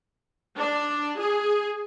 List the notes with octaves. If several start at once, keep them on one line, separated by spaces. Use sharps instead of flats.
D4
G#4